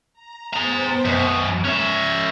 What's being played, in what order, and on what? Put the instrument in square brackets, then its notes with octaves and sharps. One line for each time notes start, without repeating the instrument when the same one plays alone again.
[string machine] A#5
[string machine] B3 C5 G5 [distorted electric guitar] G#4 A#5
[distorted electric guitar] F#2 B2
[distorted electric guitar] C#4 E5 [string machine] G#6